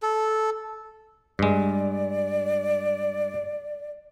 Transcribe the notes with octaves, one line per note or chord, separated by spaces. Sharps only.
A4
G2 G#3 D5